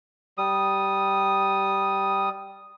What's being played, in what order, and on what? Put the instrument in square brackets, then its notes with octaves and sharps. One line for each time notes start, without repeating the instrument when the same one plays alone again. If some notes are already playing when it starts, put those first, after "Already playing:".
[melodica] G3 D#6